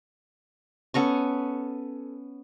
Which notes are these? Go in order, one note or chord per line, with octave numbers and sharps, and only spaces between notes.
B3 C#4 A4 C#6